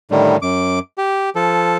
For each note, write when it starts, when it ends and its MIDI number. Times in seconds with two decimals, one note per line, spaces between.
0.11 0.37 45
0.11 0.37 50
0.11 0.37 51
0.11 0.37 55
0.42 0.79 42
0.42 0.79 86
0.98 1.30 67
1.35 1.77 53
1.35 1.77 69